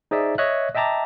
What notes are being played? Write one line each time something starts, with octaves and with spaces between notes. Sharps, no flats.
D#4 G#4 C5 D5 E5
C#5 D#5 E5 F#6
D#5 E5 G5 A5 A#5 D6